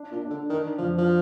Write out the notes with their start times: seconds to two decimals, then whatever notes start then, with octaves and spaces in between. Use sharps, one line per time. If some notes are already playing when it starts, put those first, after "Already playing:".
Already playing: D4
0.12 A#2
0.22 D4
0.30 D3
0.49 D#3 D4
0.78 F2 F3
0.98 F3